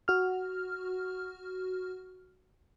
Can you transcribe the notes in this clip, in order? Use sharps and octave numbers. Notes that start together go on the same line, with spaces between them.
F#4 F6